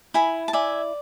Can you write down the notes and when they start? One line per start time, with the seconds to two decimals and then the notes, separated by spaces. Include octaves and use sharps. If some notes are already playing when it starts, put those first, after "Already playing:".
0.14 E4 G#5 B5
0.48 A5
0.53 D5 E5 G#5